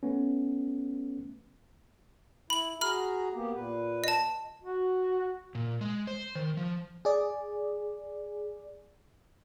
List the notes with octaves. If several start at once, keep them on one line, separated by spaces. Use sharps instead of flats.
A3 B3 C#4
E4 B5 F#7
F#4 G#4 A#5 B5 F6
A#3 B3 G4
A#2 B4
D#5 A5
F#4
A#2
G#3
C5
D#3
F3
G#4 D5